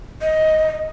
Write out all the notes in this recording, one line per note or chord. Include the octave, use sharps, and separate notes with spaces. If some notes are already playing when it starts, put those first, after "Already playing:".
D#5